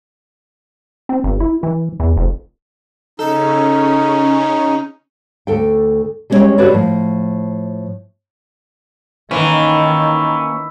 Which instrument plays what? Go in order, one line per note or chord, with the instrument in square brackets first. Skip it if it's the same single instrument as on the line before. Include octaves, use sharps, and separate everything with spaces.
[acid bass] C4
G1
E4
E3
E2
F1
[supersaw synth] C#3 C#4 [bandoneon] D#4 [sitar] A4
[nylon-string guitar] D2 A4 G5
G3 G#3 C#4 A#4 C#5 G5
D3 F#4 G4 B4 C#5 D5
A2 F3
[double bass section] D#3 [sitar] E3 [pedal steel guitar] A#3 C#4